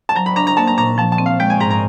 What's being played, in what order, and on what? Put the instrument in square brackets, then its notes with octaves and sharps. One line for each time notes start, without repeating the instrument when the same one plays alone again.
[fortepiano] A5
[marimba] F#3 [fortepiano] A#5
[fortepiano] B5
[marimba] D4 [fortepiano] A#5
[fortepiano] A#5
[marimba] A#3 [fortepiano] A5
[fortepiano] A#5
[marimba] A#2 [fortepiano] A#5
[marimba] F3 [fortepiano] A5
[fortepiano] A5
[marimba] C4
[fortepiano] F5
[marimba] G#3 [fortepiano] G5
[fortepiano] G#5
[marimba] G#2 [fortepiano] A#5
[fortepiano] A#5